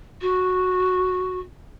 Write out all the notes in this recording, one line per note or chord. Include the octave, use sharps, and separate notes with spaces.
F#4